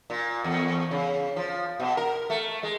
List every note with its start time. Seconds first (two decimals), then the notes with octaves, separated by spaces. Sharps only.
0.10 A#2
0.44 E2
0.91 C#3
1.36 F3
1.80 B2
1.97 A#4
2.30 A3
2.63 G#3